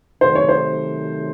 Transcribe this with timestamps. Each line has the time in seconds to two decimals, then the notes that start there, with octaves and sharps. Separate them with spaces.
0.21 C3 D#3 F#3 A3 C5
0.35 C#5
0.49 C5